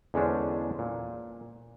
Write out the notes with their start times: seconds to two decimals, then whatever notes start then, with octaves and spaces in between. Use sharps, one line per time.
0.14 E2 D3 G#3 C#4 D4 C5
0.79 A#2